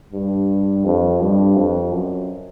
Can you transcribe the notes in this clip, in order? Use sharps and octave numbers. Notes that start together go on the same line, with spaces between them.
G2
F2
G2
F2
F#2